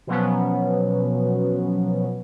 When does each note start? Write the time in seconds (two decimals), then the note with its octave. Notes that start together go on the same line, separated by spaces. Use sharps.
0.07 B2 F3 F#3 B3 C#4